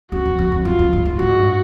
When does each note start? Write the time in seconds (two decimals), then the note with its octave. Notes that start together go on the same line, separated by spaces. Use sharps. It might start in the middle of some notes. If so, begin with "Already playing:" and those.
0.12 F#2 F#4
0.26 F2
0.39 F2
0.52 F2
0.65 F#2 F4
0.79 F2
0.93 G2
1.05 G#2
1.19 G2 F#4
1.29 G#2
1.38 G2